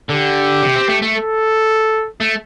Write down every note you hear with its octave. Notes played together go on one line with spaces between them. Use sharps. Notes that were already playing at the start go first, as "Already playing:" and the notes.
D3 G4
C3
C4
A3
A3
A4
A3